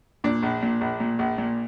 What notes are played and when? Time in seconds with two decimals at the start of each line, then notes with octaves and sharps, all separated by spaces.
0.24 A#2 D4
0.43 A#1
0.62 A#2
0.81 A#1
1.00 A#2
1.19 A#1
1.38 A#2